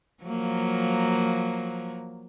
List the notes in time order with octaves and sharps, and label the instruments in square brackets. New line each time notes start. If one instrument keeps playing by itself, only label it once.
[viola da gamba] F3 F#3 A#3